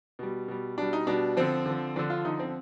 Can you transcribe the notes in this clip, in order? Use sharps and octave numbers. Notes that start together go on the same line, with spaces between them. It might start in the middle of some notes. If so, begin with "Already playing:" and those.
B2 G3
B2 G3
B2 G3 D4
D#4
B2 G3 D4
D3 F3 C4
D3 F3
D3 F3 D4
F4
D3 F3 D#4
C4